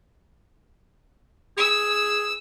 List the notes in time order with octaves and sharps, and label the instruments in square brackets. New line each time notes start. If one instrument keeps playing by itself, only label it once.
[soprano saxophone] G#4 [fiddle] E6